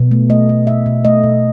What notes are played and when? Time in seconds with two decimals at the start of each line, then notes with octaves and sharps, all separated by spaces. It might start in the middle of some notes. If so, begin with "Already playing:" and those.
Already playing: B2
0.11 A3
0.30 A3 D#5
0.49 A3
0.67 B2 E5
0.86 B2
1.05 A3 D#5
1.24 B2